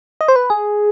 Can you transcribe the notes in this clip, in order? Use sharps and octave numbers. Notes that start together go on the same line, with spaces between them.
D#5
C5
B4
G#4